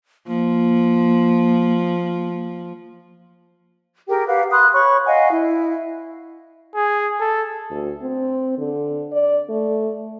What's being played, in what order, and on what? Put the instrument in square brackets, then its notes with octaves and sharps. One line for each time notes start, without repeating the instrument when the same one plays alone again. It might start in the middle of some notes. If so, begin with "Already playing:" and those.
[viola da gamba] F3 [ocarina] A#3
[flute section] G4 G#4 A#4 G5
G4 B4 F5 F#5
B5 C6 D#6 F#6
C#5 B5 C#6
D#5 F5 F#5 G#5
E4
[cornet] G#4
A4
[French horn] D2
C4
D3
D5
A3